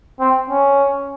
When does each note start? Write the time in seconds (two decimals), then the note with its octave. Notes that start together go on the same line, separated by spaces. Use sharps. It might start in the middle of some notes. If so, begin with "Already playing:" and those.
0.20 C4
0.50 C#4